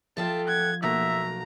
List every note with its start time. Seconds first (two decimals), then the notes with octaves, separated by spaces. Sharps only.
0.17 F3 F4 A4 E5 G5 A5 E7
0.47 F#5 G#6
0.83 B1 A3 A#3 F#4 E5 A#5